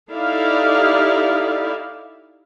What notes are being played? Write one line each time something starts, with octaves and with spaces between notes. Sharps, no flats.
D#4 E4 G4 A4 D5 F5